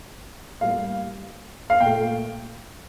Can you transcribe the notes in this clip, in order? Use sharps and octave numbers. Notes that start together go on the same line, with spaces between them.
A2 G3 A#3 F5
F5
A#2 G5
A3